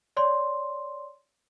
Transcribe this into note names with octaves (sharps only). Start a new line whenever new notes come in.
C#5 D5 C6